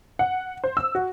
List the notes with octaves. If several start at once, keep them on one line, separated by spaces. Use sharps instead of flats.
F#5
C5
E6
F#4